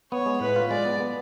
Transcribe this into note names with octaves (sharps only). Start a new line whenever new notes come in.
B3 C#5
G#3
A2 B4
F4
G#3 D5
B3
B3